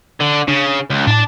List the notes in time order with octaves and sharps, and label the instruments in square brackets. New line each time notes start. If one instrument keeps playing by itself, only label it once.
[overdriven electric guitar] D3
[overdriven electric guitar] C#3 [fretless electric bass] D4
[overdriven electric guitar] C#2
[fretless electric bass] A2 [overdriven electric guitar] D4 A5